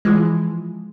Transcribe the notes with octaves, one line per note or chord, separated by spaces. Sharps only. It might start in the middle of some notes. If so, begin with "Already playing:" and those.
E3 F3 G#3